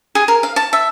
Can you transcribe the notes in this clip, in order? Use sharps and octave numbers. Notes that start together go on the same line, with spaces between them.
G#4
A#4
F5
A5
E5